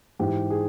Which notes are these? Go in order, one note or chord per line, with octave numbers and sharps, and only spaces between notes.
G#2 E3 G4
G#4